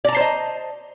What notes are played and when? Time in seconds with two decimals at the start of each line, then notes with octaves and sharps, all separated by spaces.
0.05 D5
0.09 A#5
0.13 A5
0.17 C5
0.21 D#5